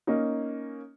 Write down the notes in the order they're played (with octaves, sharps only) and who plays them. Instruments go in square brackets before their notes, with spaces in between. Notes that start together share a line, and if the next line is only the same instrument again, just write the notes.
[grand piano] A#3 C#4 D#4